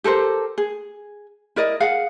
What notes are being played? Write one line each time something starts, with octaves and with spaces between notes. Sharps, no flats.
G4 A4 A#4 C5
G#4
E4 A#4 D5 D#5
G#4 F5 F#5